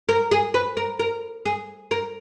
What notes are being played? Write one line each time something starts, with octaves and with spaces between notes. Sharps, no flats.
A#4
G#4
B4
A#4
A#4
G#4
A#4